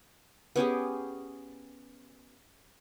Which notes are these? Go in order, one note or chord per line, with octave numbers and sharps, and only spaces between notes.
B3 C#4 G4 G#4